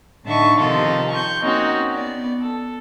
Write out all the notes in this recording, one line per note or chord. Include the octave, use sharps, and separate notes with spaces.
A2 D3 D#4 E5 A5 C#6
C3 D#3 F3 D#4 F4 A4
C#6 G6
A#3 C4 C#4 D#4 F#4
B3 D5
A4